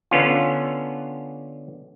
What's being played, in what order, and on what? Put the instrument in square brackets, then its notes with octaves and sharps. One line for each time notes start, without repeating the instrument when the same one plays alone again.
[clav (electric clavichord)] D3 B3 C#4 F4